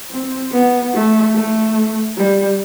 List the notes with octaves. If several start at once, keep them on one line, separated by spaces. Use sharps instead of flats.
C4
B3
A3
A3
G3